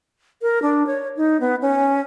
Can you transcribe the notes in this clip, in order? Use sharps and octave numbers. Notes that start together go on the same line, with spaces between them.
A#4
D4
C#5
D#4
B3
C#4